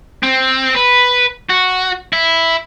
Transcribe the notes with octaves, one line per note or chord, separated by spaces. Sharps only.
C4
B4
F#4
E4